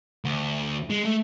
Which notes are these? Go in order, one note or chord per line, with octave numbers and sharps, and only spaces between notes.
D2
G#3
A3